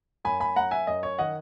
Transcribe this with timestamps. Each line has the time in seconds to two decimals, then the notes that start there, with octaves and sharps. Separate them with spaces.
0.25 F#2 G#5 B5
0.40 G#5 B5
0.56 F#2 F#5 A#5
0.71 E5 G#5
0.87 F#2 D#5
1.03 C#5
1.18 D#3 D#5 F#5